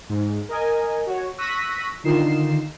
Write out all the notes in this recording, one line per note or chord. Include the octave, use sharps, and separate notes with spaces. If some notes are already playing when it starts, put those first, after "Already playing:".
G#2
A#4 D#5 G#5
F#4 C#5
C#6 E6 F#6 A#6 B6 D#7
D3 D#3 D#4 F4 C7 E7